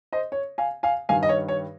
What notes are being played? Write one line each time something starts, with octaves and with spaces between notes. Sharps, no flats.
C5 D#5
C#5
F5 G#5
F5 G#5
G2 D#3 G3 F5 G#5
D#5
C#5
C#5